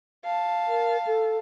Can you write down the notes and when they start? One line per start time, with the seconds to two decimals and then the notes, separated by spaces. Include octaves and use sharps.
0.24 F5 A5
0.68 A#4
1.07 A4